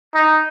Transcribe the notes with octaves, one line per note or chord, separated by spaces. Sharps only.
D#4